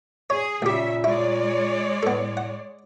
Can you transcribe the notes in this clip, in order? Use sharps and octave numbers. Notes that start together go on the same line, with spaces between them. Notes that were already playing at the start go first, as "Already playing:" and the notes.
G#4 C#5
C#2 A#2 C#3 G4 E5
G#3 E4 C#5 D5
A2 B3 A4
F#5